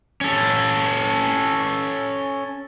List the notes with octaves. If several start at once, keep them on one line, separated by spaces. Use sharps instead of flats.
C#4 A4